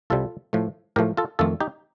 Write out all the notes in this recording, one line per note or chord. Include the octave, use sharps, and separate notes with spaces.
C2 C3 G3 F4 A4
A2 F3 A3
A2 F3 A3 G4 A#4
F4 A4
F2 D#3 A3 F4 A4
D#4 G4